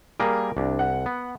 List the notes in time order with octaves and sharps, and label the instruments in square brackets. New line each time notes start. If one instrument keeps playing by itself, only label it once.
[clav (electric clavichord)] G3 A#3 G#4 [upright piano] A#4
[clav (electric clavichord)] C2 [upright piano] D4
[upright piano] F#5
[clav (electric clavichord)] B3